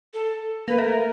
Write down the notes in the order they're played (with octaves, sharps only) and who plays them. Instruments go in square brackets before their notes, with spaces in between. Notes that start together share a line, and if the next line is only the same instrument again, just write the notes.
[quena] A4
[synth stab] A#3 [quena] B4
[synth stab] A3 [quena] A#4